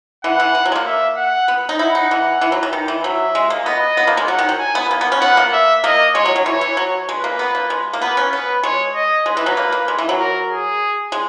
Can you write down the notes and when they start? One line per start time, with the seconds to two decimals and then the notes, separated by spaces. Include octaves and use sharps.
0.24 E3 F#5
0.40 E3
0.55 E3
0.66 F#3
0.72 G#3
0.76 A#3
0.86 E5
1.17 F#5
1.48 B3
1.69 D#4
1.79 E4 F#5
1.95 D#4
2.11 E3
2.41 E3
2.52 F#3
2.63 E3
2.73 D#3
2.88 E3
3.04 F#3 E5
3.35 G#3
3.50 A#3
3.65 B3 D#5
3.97 B3
4.07 A#3
4.17 G#3
4.28 F#3 F#5
4.39 D#3
4.49 F#3
4.59 G#5
4.75 B3
4.91 A#3
5.01 B3
5.12 C#4
5.21 B3 F#5
5.37 A#3
5.53 E5
5.84 A#3 D#5
6.14 G#3 C#5
6.25 F#3
6.36 F#3
6.46 E3 C#5
6.61 E3
6.77 F#3
7.08 G#3 B4
7.24 A#3
7.39 B3
7.55 A#3
7.70 G#3
7.93 A#3
8.01 B3 B4
8.17 C#4
8.32 B3 B4
8.63 G#3 C#5
8.95 D#5
9.26 G#3 B4
9.37 E3
9.46 F#3
9.57 A#3
9.72 A#3
9.88 G#3
9.98 E3
10.09 F#3
10.19 A#4
10.50 G#4
11.12 G#3